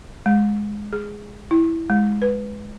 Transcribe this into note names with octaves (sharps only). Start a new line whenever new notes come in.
G#3
G#4
E4
G#3
B4